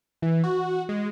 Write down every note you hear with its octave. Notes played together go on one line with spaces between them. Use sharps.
E3
F#4
G#3